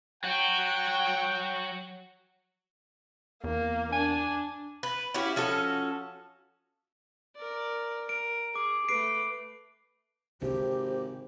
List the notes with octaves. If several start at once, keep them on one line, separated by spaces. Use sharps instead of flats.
F#3 F#4 G5
E2 A#3
D4 G#5
B4
C#4 E4 F#4 G4
F3 C#4 F#4 A4
A#4 D5
A#4 D7
G#4 D6
A3 B4 C7 D7
G#1 C3 D4 G4 C5